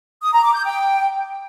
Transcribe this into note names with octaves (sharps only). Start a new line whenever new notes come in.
D#6
A#5
D6
G6
G5